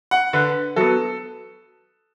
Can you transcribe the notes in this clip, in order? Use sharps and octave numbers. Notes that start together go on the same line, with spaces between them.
F#5
D3 B4
F#3 B3 A4